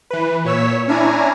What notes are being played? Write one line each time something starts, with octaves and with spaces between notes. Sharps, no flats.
E3 B4
A#2 C#5 E6 B6
C#4 D4 E4 G#5 A#5